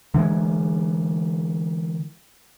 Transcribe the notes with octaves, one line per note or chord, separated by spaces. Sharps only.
D3 E3 G3 G#3